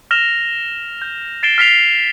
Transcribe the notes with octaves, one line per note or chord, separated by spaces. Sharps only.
F6 A#6 E7 F7
G6
A6 C7 D7 E7 G7
F6 B6 C7 F7